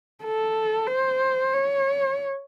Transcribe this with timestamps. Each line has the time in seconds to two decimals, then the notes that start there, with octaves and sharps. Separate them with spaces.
0.23 A4
0.88 C5
1.54 C#5